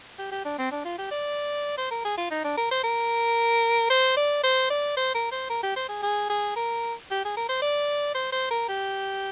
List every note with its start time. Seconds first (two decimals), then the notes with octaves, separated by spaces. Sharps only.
0.19 G4
0.32 G4
0.45 D4
0.58 C4
0.72 D4
0.85 F4
0.98 G4
1.11 D5
1.78 C5
1.91 A#4
2.05 G#4
2.17 F4
2.31 D#4
2.44 D4
2.57 A#4
2.71 C5
2.84 A#4
3.90 C5
4.16 D5
4.43 C5
4.70 D5
4.97 C5
5.14 A#4
5.32 C5
5.49 A#4
5.63 G4
5.76 C5
5.89 G#4
6.02 G#4
6.30 G#4
6.56 A#4
7.11 G4
7.25 G#4
7.37 A#4
7.49 C5
7.62 D5
8.15 C5
8.32 C5
8.51 A#4
8.69 G4